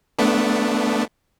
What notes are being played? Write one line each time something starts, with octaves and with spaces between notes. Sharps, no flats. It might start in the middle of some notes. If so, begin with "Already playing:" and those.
A3 B3 D4